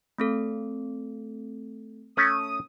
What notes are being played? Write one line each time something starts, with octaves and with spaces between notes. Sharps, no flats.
A3 C4 A4
A3 C#4 D#6